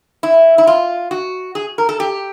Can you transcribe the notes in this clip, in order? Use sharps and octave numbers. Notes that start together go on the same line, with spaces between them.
E4
E4
F4
F#4
G#4
A#4
A4
G4